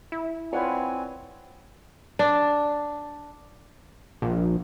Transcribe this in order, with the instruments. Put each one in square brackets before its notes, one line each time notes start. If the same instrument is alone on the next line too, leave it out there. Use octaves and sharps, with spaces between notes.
[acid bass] E4
[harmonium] C4 G#5 [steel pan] F4 B4 [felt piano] C#5 D5 F#5
[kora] D4
[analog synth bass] A#1